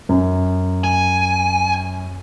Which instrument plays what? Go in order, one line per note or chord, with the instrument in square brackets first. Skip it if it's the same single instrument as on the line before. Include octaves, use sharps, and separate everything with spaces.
[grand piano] F#2
[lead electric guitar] G#5